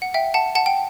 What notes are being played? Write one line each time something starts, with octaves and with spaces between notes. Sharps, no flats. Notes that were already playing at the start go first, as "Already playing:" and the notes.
F#5
E5 G5
F#5 A5
F#5 A5
G5